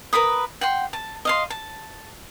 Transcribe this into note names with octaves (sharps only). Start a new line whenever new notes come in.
A#4 B4 B5 D#6
F#5 G5 C6
A5
D#5 F5 C6
A5